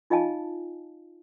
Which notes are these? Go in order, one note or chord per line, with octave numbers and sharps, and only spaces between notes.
D#4 F4 D#5 F5 G#5 A5